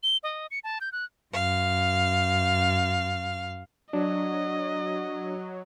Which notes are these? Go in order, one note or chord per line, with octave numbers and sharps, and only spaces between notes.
G7
D#5
C#7
A5
G6
F#6
F#2 F5
F#3 D4 D#5